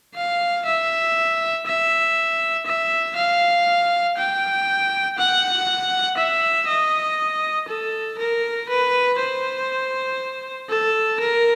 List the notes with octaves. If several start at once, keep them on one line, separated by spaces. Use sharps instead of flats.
F5
E5
E5
E5
F5
G5
F#5
E5
D#5
A4
A#4
B4
C5
A4
A#4